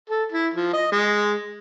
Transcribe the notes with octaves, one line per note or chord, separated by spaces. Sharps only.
A4
E4
F3
D#5
G#3